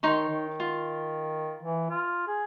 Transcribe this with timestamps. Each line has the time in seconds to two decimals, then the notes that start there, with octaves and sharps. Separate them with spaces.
0.03 D#3 D#4 C#5 C6
0.29 D#3
0.60 F4
1.63 E3
1.90 F4
2.27 G#4